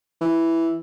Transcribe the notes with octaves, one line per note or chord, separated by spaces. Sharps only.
E3